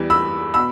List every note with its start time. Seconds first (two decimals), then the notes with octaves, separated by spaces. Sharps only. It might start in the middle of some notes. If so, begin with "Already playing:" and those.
Already playing: E2 E3 G3
0.10 B5 E6
0.54 B2 B5 E6